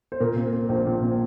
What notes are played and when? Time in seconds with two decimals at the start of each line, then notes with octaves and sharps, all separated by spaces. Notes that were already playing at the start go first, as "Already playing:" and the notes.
0.12 C5
0.20 A#2 A#4
0.36 C4
0.53 C4
0.69 A#1 C5
0.87 A#2
1.02 C4